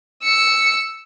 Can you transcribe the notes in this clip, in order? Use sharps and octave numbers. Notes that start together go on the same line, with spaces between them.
E6 C#7